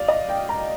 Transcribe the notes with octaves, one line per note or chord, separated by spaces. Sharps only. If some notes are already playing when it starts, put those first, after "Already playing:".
Already playing: D5 F5
D#5
G5
A#5